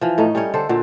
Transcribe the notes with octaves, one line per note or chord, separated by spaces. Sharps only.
E3 F3
A2 A3 D#4
G3 C#4 D#4 C#5
D3 A4 C5
A#2 D3 F#4 C5